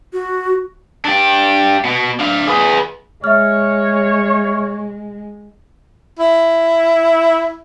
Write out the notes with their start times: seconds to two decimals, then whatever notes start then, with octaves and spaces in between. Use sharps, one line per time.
0.13 F#4
1.05 D4 G4
1.85 B2
2.20 D4 F5
2.47 G#4 B4
3.24 G#3 C#5 E5 F6
6.19 E4